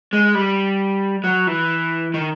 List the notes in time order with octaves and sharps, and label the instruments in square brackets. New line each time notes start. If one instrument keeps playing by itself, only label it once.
[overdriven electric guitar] G#3
G3
F#3
E3
D#3